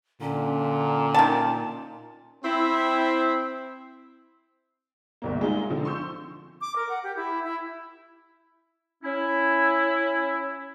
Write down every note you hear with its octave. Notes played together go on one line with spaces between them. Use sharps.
A#2 D3 C#4
D#3 A5
C4 E4
G1 C2 A#3
G#3 D#4 F4
D3 F3 C4
C6 C#6 E6 G6
D6
A#4
F#5
G4
E4
E4
C#4 E4